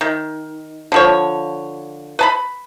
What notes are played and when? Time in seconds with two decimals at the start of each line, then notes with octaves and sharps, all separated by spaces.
0.01 D#3
0.92 D3 F3 C#5
2.19 B4 A5 B5